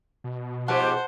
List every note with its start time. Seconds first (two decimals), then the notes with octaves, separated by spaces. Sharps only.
0.24 B2
0.68 G#2 F3 G4 C5 F#5 A5 F#6